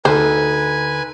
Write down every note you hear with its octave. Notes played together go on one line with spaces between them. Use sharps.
D2 D#4 A4 B4 C5 G#5